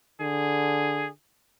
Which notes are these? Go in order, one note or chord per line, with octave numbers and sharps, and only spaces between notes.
D3 G#4